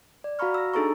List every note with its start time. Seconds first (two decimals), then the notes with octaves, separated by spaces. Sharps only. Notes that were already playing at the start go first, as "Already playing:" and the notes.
0.24 D5
0.39 F#4 F5 A#5 B5 C#6 F6
0.54 E6 A#6
0.74 D4 D#4 G#4 A4 A#5 C#6